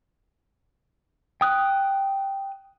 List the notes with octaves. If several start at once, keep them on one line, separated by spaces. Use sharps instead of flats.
G5 D#6 F#6